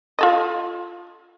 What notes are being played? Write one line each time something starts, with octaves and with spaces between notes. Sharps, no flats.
F4 A4 D#5